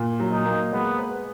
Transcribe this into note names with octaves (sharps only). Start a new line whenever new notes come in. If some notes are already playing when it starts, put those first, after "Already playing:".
Already playing: A#2
F#3
D#4
A#3
G#3 B3
B4